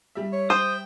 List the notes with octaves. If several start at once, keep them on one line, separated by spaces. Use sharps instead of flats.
G3 E5
C#5
C5 G5 D#6